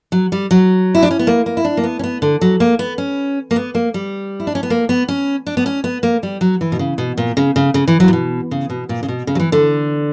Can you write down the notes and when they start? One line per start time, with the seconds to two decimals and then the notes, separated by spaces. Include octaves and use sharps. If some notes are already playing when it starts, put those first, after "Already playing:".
0.12 F#3
0.32 G3
0.51 F#3
0.95 E4
1.03 D4
1.11 C#4
1.19 B3
1.27 A#3
1.46 A#3
1.57 E4
1.64 D4
1.77 A#3
1.84 B3
1.99 C#4
2.04 B3
2.22 D3
2.41 F#3
2.60 A#3
2.79 B3
2.98 C#4
3.51 A#3
3.56 B3
3.75 A#3
3.94 G3
4.40 E4
4.47 D4
4.55 C#4
4.63 B3
4.70 A#3
4.89 B3
5.08 C#4
5.47 D4
5.57 B3
5.66 C#4
5.84 B3
6.03 A#3
6.23 G3
6.41 F#3
6.61 E3
6.72 B2
6.79 C#3
6.98 B2
7.18 A#2
7.37 C#3
7.56 C#3
7.74 C#3
7.88 E3
8.00 F#3
8.08 A#2
8.13 B2
8.51 C#3
8.70 B2
8.89 A#2
9.03 C#3
9.08 B2
9.27 C#3
9.35 F#3
9.39 E3
9.52 D3